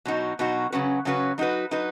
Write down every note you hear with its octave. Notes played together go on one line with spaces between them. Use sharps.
B2 F#3 D#4 F#4
B2 F#3 D#4 F#4
C#3 F#3 C#4 F#4 B4
C#3 F#3 C#4 F#4 B4
F#3 D#4 F#4 B4
F#3 D#4 F#4 B4